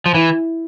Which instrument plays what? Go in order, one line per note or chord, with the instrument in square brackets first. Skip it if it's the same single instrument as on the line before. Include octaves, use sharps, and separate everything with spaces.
[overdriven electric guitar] F3
[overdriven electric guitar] E3 [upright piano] E4